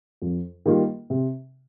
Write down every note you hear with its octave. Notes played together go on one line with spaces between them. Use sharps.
F2
D#3 G3 A#3 F4
C3